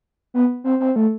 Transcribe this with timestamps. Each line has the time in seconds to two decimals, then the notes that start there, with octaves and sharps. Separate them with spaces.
0.34 B3
0.64 C4
0.80 C4
0.96 A3